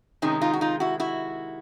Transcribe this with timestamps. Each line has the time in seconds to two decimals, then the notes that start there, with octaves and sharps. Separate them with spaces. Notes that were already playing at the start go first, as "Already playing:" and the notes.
0.22 C3 D#3 G#3 C#4 D#4
0.41 D#4 F4
0.54 F#4
0.61 D#4 F4
0.80 E4 F#4
1.00 E4 F#4